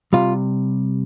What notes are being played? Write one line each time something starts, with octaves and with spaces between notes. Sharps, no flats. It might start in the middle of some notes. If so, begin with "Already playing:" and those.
C3 G3 F4